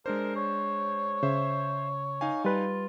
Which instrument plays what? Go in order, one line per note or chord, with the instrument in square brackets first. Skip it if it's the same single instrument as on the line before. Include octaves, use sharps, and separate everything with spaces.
[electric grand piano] G#3 D4 C5 [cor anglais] A#4
[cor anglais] C#5
[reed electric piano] C#3 [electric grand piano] C5 E5
[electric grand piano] D#4 F5 G#5
[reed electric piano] G3 B4 [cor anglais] F4